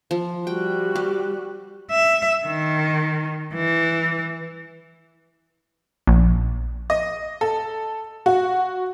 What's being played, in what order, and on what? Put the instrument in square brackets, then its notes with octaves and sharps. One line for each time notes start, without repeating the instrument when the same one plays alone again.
[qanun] F3
[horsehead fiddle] G3 F#4 [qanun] G5
[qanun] G4
[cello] E5
D#3
E3
[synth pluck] A#1
[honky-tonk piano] D#5
A4
F#4